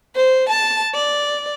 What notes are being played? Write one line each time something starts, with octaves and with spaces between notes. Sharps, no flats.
C5
A5
D5